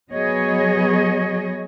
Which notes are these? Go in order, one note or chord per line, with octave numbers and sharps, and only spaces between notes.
F#3 B3 G#4 C#5 D#5